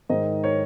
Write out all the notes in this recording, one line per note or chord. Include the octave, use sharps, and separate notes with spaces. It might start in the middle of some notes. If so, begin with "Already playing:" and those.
G#2 D#3 C5 D#5
A#4 C#5